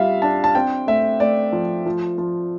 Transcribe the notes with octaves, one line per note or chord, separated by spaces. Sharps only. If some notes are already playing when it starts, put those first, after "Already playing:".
Already playing: G3 F4 E5 F5
D4 A5
A5
C4 G5
A3 E5
A3 D5
F3
F3
F3